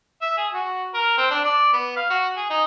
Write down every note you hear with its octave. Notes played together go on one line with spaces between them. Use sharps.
E5
G#4
F#4
A#4
C4
D4
D5
B3
F5
F#4
G#4
D#4